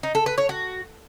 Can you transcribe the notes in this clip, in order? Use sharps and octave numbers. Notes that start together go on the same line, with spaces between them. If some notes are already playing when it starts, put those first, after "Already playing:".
D#4
A4
B4
C#5
F#4